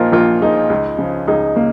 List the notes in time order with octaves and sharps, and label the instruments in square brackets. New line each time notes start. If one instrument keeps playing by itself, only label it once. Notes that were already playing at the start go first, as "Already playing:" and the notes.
Already playing: [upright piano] A#1 A#2 F3 D#4 F4 A#4
A#1 F4 A#4
A#2 F3 D#4 G#4
C#2
C#3 F3
C#2 D#4 G#4
C#3 A#3